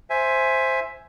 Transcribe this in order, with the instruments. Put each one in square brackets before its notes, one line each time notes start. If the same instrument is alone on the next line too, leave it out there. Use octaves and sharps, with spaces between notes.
[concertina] C5 E5 G#5